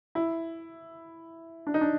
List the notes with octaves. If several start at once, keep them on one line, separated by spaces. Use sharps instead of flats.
E4
D4
D#4
D4